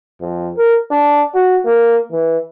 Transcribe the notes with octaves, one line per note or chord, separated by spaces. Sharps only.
F2
A#4
D4
F#4
A#3
E3